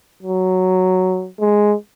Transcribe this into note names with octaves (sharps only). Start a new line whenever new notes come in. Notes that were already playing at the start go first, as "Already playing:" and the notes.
F#3
G#3